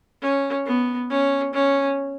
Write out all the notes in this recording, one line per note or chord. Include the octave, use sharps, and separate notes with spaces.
C#4
B3
C#4
C#4